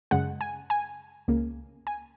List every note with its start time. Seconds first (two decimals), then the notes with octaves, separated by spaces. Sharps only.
0.11 F#2 C#3 G#3 F#5
0.41 G#5
0.70 G#5
1.28 C#2 C#3 A#3
1.87 G#5